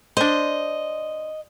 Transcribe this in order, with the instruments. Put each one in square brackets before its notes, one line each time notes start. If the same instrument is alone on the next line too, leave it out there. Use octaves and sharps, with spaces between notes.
[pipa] D4 C5 [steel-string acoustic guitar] D#5